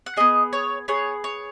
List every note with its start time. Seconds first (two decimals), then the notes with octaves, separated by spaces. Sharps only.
0.06 F#5
0.17 B3 G#4 D#5
0.53 C#5
0.88 B3 G#4 C#5
1.24 C#5